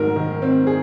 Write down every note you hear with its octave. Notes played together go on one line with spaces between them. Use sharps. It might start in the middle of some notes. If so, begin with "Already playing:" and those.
Already playing: G#2 D#3 F#3 A#4
D#3
C4
G#4